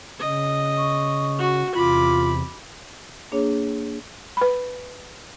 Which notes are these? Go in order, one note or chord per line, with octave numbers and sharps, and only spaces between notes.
C#3 D#5
C#6
F#4
E2 C3 F4 B5 D6
A#3 D4 G#4 C#5
B4 B5